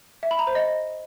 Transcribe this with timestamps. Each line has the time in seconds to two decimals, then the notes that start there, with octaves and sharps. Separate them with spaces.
0.23 E5
0.31 B5
0.39 A#5
0.47 C5
0.55 D#5